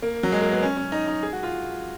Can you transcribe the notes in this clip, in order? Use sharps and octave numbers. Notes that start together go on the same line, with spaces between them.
A#3
F#3
G#3
A#3
B3
C#4
C#4
D#4
D#4
G#4
F#4
F4